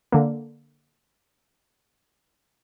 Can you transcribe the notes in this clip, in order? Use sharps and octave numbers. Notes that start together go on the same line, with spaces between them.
D3 A#3